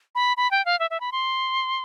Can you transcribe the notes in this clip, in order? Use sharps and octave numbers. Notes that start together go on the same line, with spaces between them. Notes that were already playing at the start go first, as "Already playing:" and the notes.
B5
B5
G5
F5
E5
E5
B5
C6